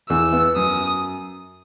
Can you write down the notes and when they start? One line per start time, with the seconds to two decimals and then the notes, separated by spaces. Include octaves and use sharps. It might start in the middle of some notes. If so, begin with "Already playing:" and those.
0.09 E2 E6
0.33 B3
0.56 F#2 D#6